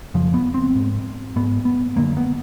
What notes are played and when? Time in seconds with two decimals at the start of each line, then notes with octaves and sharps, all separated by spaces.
0.14 F2 C#3 F3
0.34 B3
0.54 C4
0.75 G#2
1.36 G#2 B3
1.65 B3
1.96 F#2 D3 A#3
2.17 B3